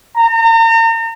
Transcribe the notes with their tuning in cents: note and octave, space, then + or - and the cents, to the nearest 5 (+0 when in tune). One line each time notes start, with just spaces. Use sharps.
A#5 -40